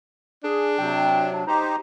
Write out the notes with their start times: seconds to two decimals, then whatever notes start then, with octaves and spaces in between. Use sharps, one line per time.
0.44 D4 G#4
0.79 C3 F#3 G5
1.33 D4
1.47 D#4 G4 C5 A#5